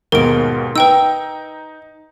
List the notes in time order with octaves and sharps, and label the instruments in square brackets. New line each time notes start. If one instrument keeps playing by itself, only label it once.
[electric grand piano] D#2 G#2 B2 [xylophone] A#4 D7
[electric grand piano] D#4 [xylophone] B4 G5 E6